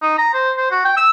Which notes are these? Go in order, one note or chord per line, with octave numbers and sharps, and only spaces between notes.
D#4
A#5
C5
C5
F#4
G5
E6